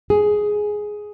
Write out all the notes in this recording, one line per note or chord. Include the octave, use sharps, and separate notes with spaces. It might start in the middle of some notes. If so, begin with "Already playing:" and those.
G#4